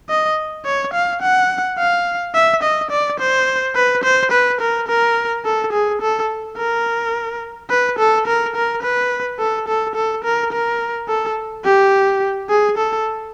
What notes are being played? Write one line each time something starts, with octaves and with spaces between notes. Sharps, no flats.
D#5
C#5
F5
F#5
F5
E5
D#5
D5
C5
B4
C5
B4
A#4
A#4
A4
G#4
A4
A#4
B4
A4
A#4
A#4
B4
A4
A4
A4
A#4
A#4
A4
G4
G#4
A4